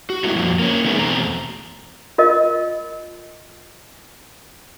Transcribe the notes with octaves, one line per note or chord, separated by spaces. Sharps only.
F#4
G3 A3 B3 D#4 E4 F#4
F2 A#2
A#3 C#4
D#3 G#3 A3 B3
E2 B2 A3 C4 A#5
F4 A#4 D#5